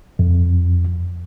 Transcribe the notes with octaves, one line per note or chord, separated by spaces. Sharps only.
F2